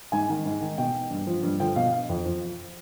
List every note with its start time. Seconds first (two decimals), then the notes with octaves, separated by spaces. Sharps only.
0.12 G#2 G#5
0.29 D#3
0.45 G#2
0.61 D#3
0.78 B2 G5
1.11 G2
1.27 F3
1.43 G2
1.60 D3 F3 G5
1.76 B2 F5
2.09 F2
2.25 F3